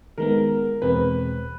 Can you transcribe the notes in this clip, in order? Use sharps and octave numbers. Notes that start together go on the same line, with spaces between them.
D#3 G#3 B3 A#4
E2 B2 G#3 C4 B4